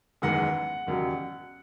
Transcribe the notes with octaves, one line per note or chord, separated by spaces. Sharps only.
F#1 E2 D#3 G#3 F#5
E1 D#2 C#3 F#3